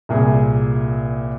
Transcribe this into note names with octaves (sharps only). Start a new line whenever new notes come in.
C2 A#2 G#4